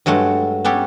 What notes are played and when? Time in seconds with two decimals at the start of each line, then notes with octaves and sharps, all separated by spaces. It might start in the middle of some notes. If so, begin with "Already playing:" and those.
0.06 G2 F#3 G#3 A3
0.65 B3 C#4 G4 A4